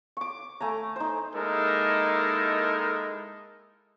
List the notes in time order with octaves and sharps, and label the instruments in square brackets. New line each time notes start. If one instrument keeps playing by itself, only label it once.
[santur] C#6 D6
A3 G#5 A#5
D#4 C5
[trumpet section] G#3 A#3 D#4 E4 A4 A#4